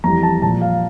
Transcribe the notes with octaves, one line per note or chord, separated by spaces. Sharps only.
F2 E3 G3 A#5
A5
A#2 F3 A5
F5